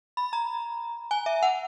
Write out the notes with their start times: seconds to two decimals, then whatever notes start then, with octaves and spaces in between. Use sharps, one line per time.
0.17 B5
0.33 A#5
1.11 G#5
1.26 E5
1.43 F#5